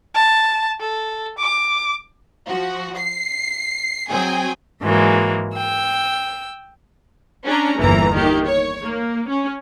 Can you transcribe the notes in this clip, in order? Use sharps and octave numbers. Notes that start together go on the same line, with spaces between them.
A5
A4
D6
F3 F#4
C7
F#3 C4 G#4 G5 G#5
G#2 E3 F#3 G#3 A#3
G5 E6
C#4 D4 A#5
G1 E2 E3 A#3 A#5
D#3 A#3 G4
C#5
A#3
C#4